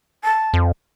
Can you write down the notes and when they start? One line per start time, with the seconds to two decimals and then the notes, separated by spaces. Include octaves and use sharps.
0.24 A5
0.54 F2